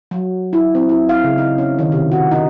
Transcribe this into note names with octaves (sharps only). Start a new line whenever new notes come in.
F#3
E4
C4
E4
F5
C#3
D#4
C#4
D#3
C3
F#4
D#4